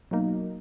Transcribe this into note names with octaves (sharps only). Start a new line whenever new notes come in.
B2 F#3 A#3 D#4